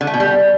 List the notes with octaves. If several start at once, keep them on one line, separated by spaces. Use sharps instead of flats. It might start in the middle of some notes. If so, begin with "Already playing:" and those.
D3
A3
B2
G3